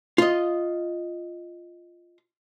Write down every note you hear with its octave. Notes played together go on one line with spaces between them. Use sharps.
F4 D#5